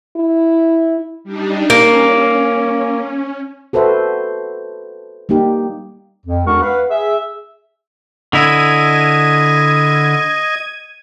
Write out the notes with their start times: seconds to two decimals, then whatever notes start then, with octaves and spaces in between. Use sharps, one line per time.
0.17 E4
1.24 G3 D4 D#4
1.70 A#3 C#4
3.73 F#4 A4 B4 C5 E5
5.29 G3 A#3 D#4 G4
6.26 F2
6.46 E2 G#3 D4 F#4 A#4 C#6
6.62 B4 F5 F#5
6.90 G#4 E5
8.33 D3 E4 D#5 G#6 D#7